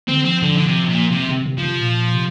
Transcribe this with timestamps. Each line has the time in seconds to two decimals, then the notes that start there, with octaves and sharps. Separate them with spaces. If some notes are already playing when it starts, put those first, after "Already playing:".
0.08 D3 C4
0.25 F3 C4
0.43 D3
0.57 D3
0.66 C3
0.89 A#2
1.11 C3
1.29 C3
1.46 C3
1.58 C3 F3
1.80 A#2
2.14 C3